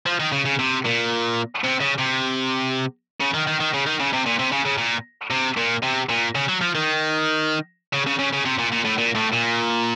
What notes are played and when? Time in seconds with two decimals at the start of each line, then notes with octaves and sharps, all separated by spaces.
0.06 F3
0.20 D#3
0.32 C#3
0.45 C#3
0.59 C3
0.85 A#2
1.64 C3
1.81 C#3
1.99 C3
3.21 C#3
3.34 D#3
3.47 D#3
3.60 D#3
3.74 C#3
3.87 D#3
4.00 C#3
4.13 C3
4.26 A#2
4.39 C3
4.52 C#3
4.65 C#3
4.78 A#2
5.31 C3
5.57 A#2
5.83 C3
6.09 A#2
6.35 C#3
6.49 F#3
6.61 F3
6.75 D#3
7.93 C#3
8.07 C#3
8.19 C#3
8.33 C#3
8.45 C3
8.59 A#2
8.72 A#2
8.85 A2
8.98 A#2
9.15 A2
9.33 A#2